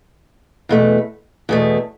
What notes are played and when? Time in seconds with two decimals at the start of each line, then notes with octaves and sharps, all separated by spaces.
0.69 E2 B2 A3
1.49 E2 B2 A3